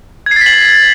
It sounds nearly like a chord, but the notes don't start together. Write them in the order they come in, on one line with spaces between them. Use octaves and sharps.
G#6 C7 A6 B6 F#7